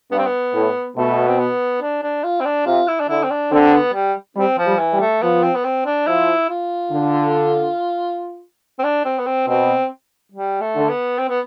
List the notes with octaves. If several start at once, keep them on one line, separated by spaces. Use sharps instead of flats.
G2 B3
C4
B3
A2
B2 A3
C4
B3
D4
D4
F4
C4
D4
C3 F4
E4
D4
D3 E4
C4
D4
D3 C4
B3
G3
G3 C4
F3
G3
E3
G3
A3
F3 B3
C4
B3
C4
D4
F3 E4
F4
D3
C4
D4
C4
B3
C4
B2 C4
G3
A3
D3
B3
C4
B3